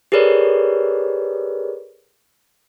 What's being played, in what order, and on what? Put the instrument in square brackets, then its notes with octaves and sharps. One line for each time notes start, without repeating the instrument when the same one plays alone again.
[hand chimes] G4 G#4 A#4 B4 C#5 D5